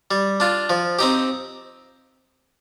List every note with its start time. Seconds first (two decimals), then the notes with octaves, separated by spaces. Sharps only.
0.11 G3
0.40 D4 F4
0.70 F3
0.99 C4 D#4 G4